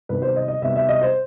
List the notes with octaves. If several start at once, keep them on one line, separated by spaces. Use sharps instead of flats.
C3 D#3 G3 B3 B4
C5
D#5
D#5
C3 D#3 G3 B3 E5
E5
D#5
C5